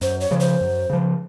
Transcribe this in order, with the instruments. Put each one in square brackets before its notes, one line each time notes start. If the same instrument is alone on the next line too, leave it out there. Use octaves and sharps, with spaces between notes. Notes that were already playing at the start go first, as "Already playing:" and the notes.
[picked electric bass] F#2 [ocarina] C5
[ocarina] C#5
[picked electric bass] C#3 F3
[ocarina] C5
[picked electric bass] F#2
C#3 F3